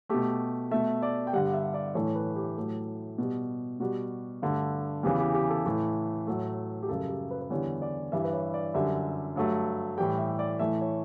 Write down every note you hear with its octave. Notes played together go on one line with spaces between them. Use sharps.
B2 A3 G4
B2 A3 E5
D5
G5
G2 D3 G3 F#5
E5
D5
A2 E3 A3 C#5
B4
G4
A2 F#3 A3
B2 G3
B2 G3 F#4
G2 D3 A3
E2 C#3 E3 G4
G4
G4
A4
A2 E3 A3
A2 F#3 A3
G4
F#2 C#3 G3 A4
G4
B4
B4
E2 D3 G3 C#5
D5
G2 E3 G3 E5
B4
C#5
D5
F#2 D3 G3 E5
G2 F#3 A3
A2 E3 G3 G5
E5
D5
A2 E3 A3 E5
C#5